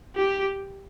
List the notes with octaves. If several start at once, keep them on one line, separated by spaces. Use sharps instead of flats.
G4